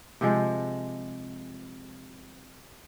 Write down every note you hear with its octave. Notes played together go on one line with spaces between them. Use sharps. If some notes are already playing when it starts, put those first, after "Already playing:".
C3 F3 G#3